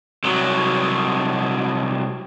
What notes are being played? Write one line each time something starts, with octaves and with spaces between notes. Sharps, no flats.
C2 F#3